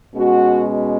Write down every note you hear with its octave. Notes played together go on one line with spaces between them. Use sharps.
B2 G#3 C#4 F#4